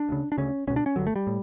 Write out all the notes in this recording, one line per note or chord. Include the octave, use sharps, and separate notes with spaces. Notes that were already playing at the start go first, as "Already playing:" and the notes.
Already playing: D4
D2 C#3
D4
D2 C#3 C#4
C#2 B2 C#4
D4
C#4
G1 G2 D3 F#3
A3
G3
A2